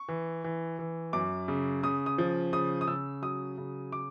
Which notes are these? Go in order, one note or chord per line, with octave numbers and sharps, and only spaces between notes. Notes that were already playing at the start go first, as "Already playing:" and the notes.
Already playing: C#6
E3
E3
E3
F#2 D6
C#3
C#3 D#6
D#6
F3
C#3 D#6
D#6
C#3 E6
F#3 D#6
C#3
D6